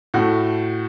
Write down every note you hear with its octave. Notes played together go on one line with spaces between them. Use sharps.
A2 A3 F#4